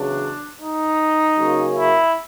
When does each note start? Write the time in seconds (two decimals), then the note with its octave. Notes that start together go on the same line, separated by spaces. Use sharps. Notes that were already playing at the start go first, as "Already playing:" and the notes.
Already playing: E2 C#3 F#3 D4
0.58 D#4
1.36 C#3 F#3 A#3 C#4
1.76 E4